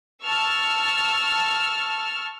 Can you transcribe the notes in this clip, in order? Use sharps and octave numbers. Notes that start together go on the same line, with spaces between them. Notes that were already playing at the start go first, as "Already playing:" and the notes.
A5 C#6 E6 F6 A6